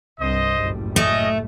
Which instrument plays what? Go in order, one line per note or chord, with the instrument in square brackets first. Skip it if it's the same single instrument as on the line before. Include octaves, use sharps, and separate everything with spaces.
[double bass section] C2 G2 [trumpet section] C5 D#5
[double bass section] F#1 A2 G3
[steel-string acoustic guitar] A3 [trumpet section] C#4 D#5